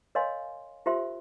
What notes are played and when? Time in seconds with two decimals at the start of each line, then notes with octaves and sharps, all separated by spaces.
0.15 A#4 C#5 D#5 F5 G#5 C6
0.86 F4 G4 A#4 C5 E5 C6